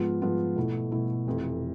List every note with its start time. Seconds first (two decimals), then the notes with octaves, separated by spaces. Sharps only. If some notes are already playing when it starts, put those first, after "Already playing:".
Already playing: G#2 F3 B3 F4
0.22 G#2 F3 B3 F4
0.56 B2 A3 E4
0.91 B2 A3 E4
1.27 F1 F2 E3